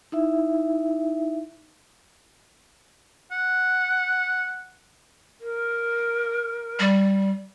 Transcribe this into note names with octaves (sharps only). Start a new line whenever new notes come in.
D#4 E4 E5
F#5
A#4
G3